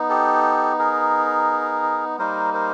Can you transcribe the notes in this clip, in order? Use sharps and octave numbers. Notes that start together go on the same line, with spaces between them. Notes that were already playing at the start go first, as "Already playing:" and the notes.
Already playing: B3 D#4
G4 A4
G#4 A#4
G3 A#3 D#4 A#4 C5
A#4 C5